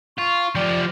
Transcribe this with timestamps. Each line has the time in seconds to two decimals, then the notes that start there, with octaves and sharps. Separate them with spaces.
0.18 F4 C#6
0.55 F3 G4 D5